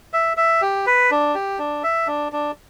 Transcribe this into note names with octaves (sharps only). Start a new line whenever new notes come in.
E5
E5
G4
B4
D4
G4
D4
E5
D4
D4